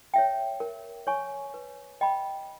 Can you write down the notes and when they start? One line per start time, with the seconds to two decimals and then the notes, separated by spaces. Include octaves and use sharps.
0.14 C#5 E5 G5
0.60 A#4
1.07 C#5 G#5 C#6
1.54 B4
2.01 D#5 G5 B5